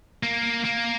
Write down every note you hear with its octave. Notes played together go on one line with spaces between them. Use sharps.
A#3
A#3